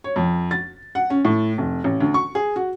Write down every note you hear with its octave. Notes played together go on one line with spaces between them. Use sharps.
C#5
F2
A6
F#5
C#4
A2
F1
A1
D2
C#6
G#4
F#4